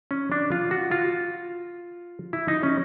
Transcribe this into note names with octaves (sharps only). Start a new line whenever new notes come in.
C#4
D4
F4
F#4
F4
E4
D#4
C#4